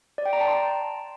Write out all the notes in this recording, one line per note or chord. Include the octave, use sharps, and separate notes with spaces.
D5
G5
A#5
A5
C6